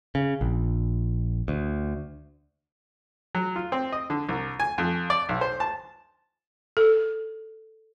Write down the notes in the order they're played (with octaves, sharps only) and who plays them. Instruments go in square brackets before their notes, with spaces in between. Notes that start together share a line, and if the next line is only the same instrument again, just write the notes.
[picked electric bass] C#3
A#1
D2
[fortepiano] F#3
F4
C4
D#5
D3
C2
G#5
F2
D5
B1
C5
A5
[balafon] A4